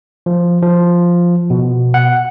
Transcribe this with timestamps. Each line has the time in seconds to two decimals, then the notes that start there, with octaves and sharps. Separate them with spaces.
0.26 F3
0.63 F3
1.50 B2
1.94 F#5